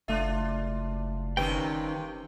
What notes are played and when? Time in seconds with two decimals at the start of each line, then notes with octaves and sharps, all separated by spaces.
0.08 F#1 A3 D4 F4 E5
1.37 G2 C3 D#3 C#4 G4 B4 G5